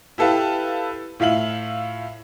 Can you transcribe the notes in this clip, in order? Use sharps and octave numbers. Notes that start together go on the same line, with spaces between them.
E4 G4 A4 B4 F5
A2 F4 E5 F5 F#7